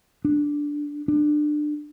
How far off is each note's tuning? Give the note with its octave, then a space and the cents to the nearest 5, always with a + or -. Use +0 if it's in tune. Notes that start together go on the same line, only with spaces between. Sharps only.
D4 -5
D4 +25